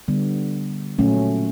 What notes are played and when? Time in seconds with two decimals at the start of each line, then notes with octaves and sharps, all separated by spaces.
0.08 D3 G3 B3
0.99 A#2 F#3 A3 C#4